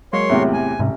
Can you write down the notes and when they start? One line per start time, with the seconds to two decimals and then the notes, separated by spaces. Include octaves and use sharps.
0.13 F#3 G#3 A#3 C#5 C6
0.29 E2 A2 C3
0.53 G#5
0.79 A1 G#2 C3